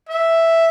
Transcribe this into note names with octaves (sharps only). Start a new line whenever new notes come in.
E5